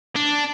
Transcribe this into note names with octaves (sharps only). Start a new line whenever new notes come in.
D4